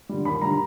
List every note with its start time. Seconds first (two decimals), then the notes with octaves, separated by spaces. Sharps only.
0.09 D3 G3
0.25 D#2 B5
0.41 D3 G3 A#5